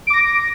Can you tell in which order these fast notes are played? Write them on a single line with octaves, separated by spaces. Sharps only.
D7 D6 A#6